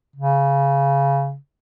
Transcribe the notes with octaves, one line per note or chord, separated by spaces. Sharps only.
C#3